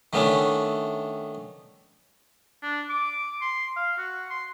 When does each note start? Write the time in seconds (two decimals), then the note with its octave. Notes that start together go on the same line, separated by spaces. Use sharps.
0.13 D#3 A3 B3 C#4 D4 E4
2.63 D4
2.90 D6
3.42 C6
3.76 F5
3.98 F#4
4.30 C6